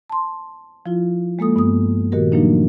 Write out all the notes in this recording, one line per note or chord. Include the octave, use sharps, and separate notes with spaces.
A5 C6
F3 E4 F4
G#3 A#3 A4 D#6
G2 B3 D#6
A#2 D#3 F#4 G4 A#4
F3 F#3 A3 A#3 D4 D#4